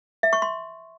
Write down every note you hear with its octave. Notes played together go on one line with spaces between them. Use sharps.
E5
C#6
C6